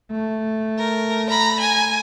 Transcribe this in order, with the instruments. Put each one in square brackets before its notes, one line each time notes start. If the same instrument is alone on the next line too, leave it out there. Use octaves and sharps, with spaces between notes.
[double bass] A3
[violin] A#4
A#5 B5
G#5